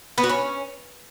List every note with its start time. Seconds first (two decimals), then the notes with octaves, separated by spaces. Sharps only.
0.18 B3
0.24 F#4
0.29 C#4